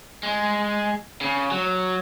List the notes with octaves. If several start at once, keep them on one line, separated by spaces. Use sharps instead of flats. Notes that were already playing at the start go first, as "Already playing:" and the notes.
G#3
C#3
F#3